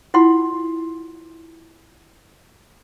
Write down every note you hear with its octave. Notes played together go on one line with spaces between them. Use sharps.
E4 F4 F#5 C6